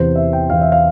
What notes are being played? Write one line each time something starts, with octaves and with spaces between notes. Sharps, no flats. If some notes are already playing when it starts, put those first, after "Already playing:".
Already playing: E2 C3 E3 C5
E5
G5
E2 C3 E3 F5
E5
F5